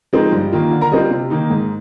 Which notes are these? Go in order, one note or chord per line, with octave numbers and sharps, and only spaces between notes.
F3 G#3 C4 D#4
G2
D#3 A#3 F4
D3
A#4 A#5
G3 C4 F4 D#5
C3
D#3 A#3 D#4
G#2